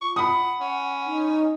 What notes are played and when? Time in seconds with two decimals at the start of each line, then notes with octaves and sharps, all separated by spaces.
0.01 F4 C#6
0.16 F#5 B5 D#6
0.60 C#4 F#5
1.07 D#4